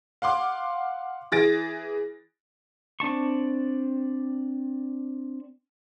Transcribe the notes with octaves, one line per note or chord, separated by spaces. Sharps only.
F5 F#5 C6 D6
E3 G#4 A6 A#6 D7
C4 D4 A5 C#6